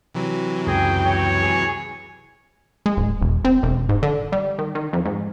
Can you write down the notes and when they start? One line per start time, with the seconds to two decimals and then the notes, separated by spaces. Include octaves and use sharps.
0.15 C3 E3 F#3
0.67 C#2 F#2 G#4 G5
1.06 C#5
1.42 G#4
2.86 G#3
2.97 D1
3.22 E1
3.45 C4
3.63 E1
3.89 G#2
4.03 D3
4.32 G3
4.59 D#3
4.75 D#3
4.93 F2
5.05 G#2